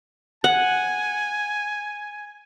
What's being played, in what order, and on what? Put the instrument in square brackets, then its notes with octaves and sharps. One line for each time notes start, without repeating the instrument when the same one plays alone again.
[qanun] F#5 [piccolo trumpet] G#5